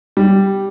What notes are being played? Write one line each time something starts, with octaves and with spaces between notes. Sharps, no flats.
G3